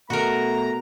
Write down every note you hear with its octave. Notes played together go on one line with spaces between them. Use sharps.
B2 A3 F#4 A#4 A#5